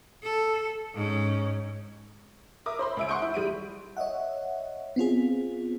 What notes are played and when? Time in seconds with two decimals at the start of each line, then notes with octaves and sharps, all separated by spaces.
0.23 A4
0.95 G#2 C#4
2.66 A#4 E5 D6 D#6
2.79 C5 B5 C6
2.97 C#2 E5 D7
3.09 F#5 C6 C#6 D#6 G6 D7
3.22 E4
3.34 G3 D7 D#7
3.97 C#5 D#5 E5 F#5
4.96 B3 C4 F4 G#4